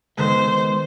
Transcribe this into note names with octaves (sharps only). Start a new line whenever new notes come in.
D#3 G#3 B3 C5